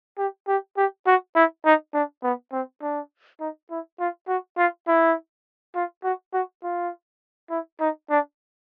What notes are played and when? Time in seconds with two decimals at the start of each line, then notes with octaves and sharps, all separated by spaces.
0.18 G4
0.48 G4
0.77 G4
1.07 F#4
1.35 E4
1.65 D#4
1.94 D4
2.24 B3
2.53 C4
2.82 D4
3.40 D#4
3.71 E4
4.00 F4
4.28 F#4
4.58 F4
4.88 E4
5.75 F4
6.04 F#4
6.34 F#4
6.64 F4
7.50 E4
7.80 D#4
8.10 D4